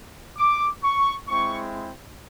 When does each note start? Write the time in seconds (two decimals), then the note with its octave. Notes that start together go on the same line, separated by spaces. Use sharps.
0.38 D6
0.84 C#6
1.28 G#3 C4 E4 C#6